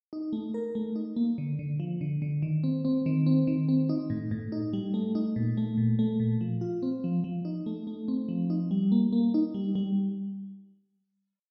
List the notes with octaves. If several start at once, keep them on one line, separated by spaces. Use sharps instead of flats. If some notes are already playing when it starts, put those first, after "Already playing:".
D#4
A3
A#4
A3
D#4
A#3
D3
D3
F3
D3
D3
D#3
C4
C4
D#3
C4
D#3
C4
D#4
A2
A2
D#4
G3
A3
D#4
A#2
A3
A#2
A3
A#2
F3
F4
C4
F3
F3
D#4
A3
A3
C4
F3
D#4
G3
A#3
A#3
D#4
G3
G3